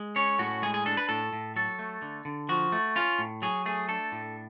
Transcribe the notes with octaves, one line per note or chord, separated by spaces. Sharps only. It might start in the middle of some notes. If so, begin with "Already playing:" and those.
Already playing: G#3
C#4 C#5
A2 F#4
G#3 G#4
G#4
D4 A4
B4
A2 A4
A2
F#3 A4
A3
D3
D3
F3 F#4
A3
C#4 F4
A2
F#3 G#4
A3 G#4
D4 A4
A2